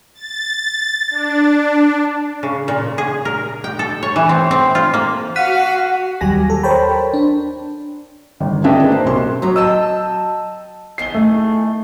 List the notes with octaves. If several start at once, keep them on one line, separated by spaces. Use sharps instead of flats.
A6
D4
C#3
A#2
G#4
A#4
G5
A4
C#5
E3
C4
C4
F4
A#3
F#4 F5 F#5 F#6 B6 D#7
D#2 F#3 G3 G4 G#5 A#6
A4
A#4 C5 C#5 G5 A5 B5
D4
G1 D#3
B3 D4 G#4 D#5 E5 G5
A#3 C5
B1 C3 C#4 C6
A2 F#3 A#5
D#5 G5 A5 E6
E2 D#3 G#4 C7 G7
A3